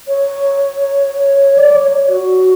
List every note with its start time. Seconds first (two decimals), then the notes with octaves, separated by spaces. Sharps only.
0.08 C#5
1.58 D5
1.76 C#5
2.09 F#4